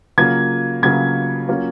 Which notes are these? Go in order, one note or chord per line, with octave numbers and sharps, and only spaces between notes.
C#3 F#3 A#3 F4 G#6
C#3 F#3 A#3 F4 G#6
F#3 A#3 C#4 F4